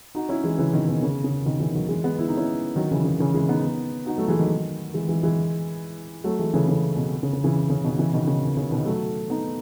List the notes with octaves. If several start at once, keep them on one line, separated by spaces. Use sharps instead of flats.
D#4 F#4
C#4 E4
E3 G#3
C#3 E3
B2 D#3
B2 D#3
C#3
C#3
B2 D#3
C#3 E3
D#3 F#3
E3 G#3
G#3 B3
E4
D#4
C#4 E4
D#3 F#3
C#3 E3
C#3
C#3 E3
E3 G#3
B3 D#4
D#4 F#4
F#3 A3
E3 G#3
D#3 F#3
E3 G#3
E3 G#3
E3 G#3
F#3 A3
E3 G#3
C#3 E3
C#3 E3
B2
C#3
C#3
C#3 E3
C#3
B2 D#3
C#3 E3
B2 D#3
C#3
B2
C#3
B2 D#3
F#3 A3
B3 D#4